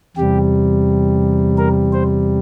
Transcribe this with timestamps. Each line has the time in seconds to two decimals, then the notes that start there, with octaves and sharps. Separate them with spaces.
0.17 E2 C3 G3 G4
1.58 A#4
1.93 C5